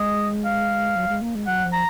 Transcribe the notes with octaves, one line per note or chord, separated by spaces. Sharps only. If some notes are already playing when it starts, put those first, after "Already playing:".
Already playing: G#3 D#5
F5
F#3
G#3
A#3
G#3
F#3 F#5
F3
A#5